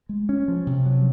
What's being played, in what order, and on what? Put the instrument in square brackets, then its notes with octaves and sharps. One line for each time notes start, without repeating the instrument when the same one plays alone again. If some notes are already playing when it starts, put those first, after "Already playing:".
[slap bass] G#3
C#4
F3
C3
F#3